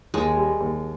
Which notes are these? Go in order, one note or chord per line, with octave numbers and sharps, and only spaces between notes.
D#2 G#3
G3
D#2